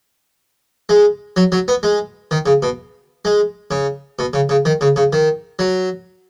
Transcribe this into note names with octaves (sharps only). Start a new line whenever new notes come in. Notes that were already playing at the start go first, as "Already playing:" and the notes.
G#3
F#3
F#3
B3
G#3
D#3
C#3
B2
G#3
C#3
B2
C#3
C#3
D#3
C#3
C#3
D#3
F#3